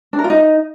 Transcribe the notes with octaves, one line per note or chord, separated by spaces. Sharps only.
D4
A#4
F4
D#4